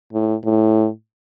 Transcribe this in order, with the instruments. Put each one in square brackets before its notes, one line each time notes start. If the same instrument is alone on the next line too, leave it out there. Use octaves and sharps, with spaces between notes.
[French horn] A2
A2